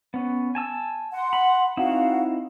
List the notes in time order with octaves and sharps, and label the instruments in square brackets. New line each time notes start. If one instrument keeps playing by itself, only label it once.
[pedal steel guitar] B3 C#4
G#5 A5 E6
[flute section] F#5 C6
[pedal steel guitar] B5
[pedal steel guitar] C4 D#4 E4 [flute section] F#4 F5 F#5